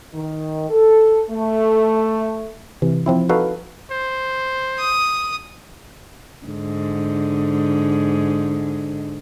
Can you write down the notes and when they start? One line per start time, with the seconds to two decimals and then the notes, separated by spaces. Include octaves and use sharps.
0.14 D#3
0.70 A4
1.30 A3
2.82 C3 E3
3.06 F3 C4 E4
3.29 D#4 F#4 A4 B4 F5
3.91 C5
4.79 D#6
6.46 G#2 D3